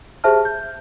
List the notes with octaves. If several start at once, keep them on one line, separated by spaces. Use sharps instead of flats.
G4 G#4 C5 E5 A5 F6
G6